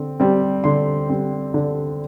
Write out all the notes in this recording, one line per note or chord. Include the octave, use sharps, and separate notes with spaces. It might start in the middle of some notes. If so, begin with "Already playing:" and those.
Already playing: D3 C4
G3 C4
D3 C6
G3 C4
D3